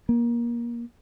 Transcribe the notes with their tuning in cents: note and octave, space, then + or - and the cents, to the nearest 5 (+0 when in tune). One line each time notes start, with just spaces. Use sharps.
A#3 +25